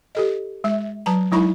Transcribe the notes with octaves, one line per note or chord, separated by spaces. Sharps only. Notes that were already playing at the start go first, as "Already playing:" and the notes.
G4 A4 D#5
G#3 E5
F#3 B4 A5 A#5
F#3 G#3 D#4 E4 B5 C#6